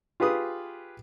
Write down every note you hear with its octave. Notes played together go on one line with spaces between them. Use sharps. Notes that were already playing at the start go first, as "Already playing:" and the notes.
F4 G4 G#4 B4 D#6